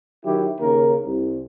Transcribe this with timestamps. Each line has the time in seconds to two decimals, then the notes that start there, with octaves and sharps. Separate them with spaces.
0.24 D#3 F#3 E4 G4
0.60 D#2 C#3 A#3 A#4
1.05 C2